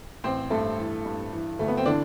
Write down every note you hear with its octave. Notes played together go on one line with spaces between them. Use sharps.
A1 C4 C5
G2 A3 A4
E3
G2
E3
D2 A3
B3
C4
D3 E3 D4